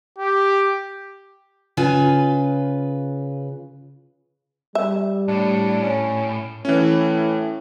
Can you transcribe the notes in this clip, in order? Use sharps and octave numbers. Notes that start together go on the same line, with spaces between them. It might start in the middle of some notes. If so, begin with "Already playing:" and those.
G4
C#3 F4 B4 G#5
G3 E5
A2 D4
C#4
A2 E3 C#4